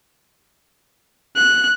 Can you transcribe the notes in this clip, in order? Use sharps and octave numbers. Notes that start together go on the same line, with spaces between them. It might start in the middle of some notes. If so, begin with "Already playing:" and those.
F#6